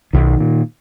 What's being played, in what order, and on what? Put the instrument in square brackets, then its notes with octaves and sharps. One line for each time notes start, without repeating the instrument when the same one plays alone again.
[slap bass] B1 D#3
A#2